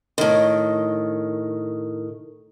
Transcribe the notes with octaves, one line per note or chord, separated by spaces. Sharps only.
A2 D#3